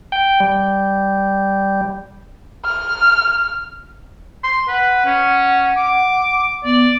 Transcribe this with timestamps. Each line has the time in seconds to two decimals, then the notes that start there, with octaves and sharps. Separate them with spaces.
0.12 G5
0.40 G3
2.64 F6
4.43 C6
4.68 B4 F#5
5.06 C#4
5.77 D6
6.65 B3 D5